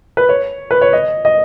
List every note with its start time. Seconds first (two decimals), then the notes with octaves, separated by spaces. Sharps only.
0.17 B4
0.29 C#5
0.71 B4
0.81 C#5
0.93 D#5
1.25 D#5